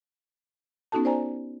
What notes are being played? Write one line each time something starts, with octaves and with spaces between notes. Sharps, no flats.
B3 C#4 D#4 F#4 A4 A5
C5 D5 G#5 A#5